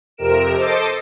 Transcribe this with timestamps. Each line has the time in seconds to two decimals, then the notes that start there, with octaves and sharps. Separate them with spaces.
0.17 F2 C3 A#4 D7 E7
0.56 A4 C5 D#5 D6